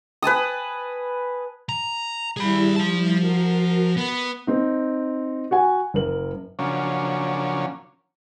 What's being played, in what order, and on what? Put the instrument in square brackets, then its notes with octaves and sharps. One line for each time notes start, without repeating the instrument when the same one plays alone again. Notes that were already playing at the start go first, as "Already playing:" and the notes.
[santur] B4 G#5 A5 D#6
[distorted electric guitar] A#5
[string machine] G3 E4 [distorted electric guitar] G#4 B5
[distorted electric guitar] F3 A5
[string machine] F#4 A#4 C7
[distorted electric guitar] B3
[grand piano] C4 D#4
F#4 F#5 G#5
F#1 A#4 F#7
[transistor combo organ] C#3 F3 F#3 A#3 C#4 D4